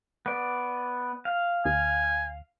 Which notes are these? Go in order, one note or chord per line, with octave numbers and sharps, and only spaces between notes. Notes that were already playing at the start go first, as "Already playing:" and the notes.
B3 D5
F5
D2 G#5